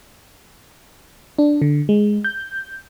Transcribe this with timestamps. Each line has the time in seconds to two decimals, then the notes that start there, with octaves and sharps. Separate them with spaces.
1.39 D4
1.62 D3
1.89 G#3
2.24 G6